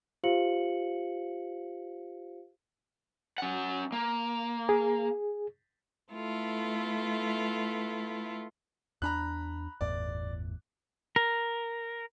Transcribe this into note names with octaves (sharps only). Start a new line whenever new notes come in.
F4 G4 C5 F5 C#7 F#7
C#4 F#5
A#3
G#4
A3 B3 E4 F4 A4
E2 D4 A#5 B5 F#6
G1 E2 A2 D5
A#4